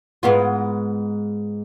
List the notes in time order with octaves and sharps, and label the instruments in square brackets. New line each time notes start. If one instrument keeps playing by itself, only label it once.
[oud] G#2 B3 F4